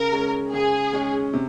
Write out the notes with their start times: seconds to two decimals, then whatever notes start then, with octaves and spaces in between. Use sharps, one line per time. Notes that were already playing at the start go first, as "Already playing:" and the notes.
Already playing: C#3 A#4
0.12 G#3 C#4
0.53 C#3 G#4
0.93 G#3 C#4
1.33 C3